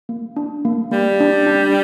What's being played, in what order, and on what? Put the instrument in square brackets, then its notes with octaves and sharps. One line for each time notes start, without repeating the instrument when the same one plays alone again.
[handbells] A#3
D4
A#3
[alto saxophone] G3 [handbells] A#3
[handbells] D4
D4